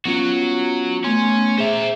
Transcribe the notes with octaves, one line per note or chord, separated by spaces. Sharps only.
F#3 B3 C#4 F4 F#4
A3 B3 C#4 C6
G#4 C5 E5 A#5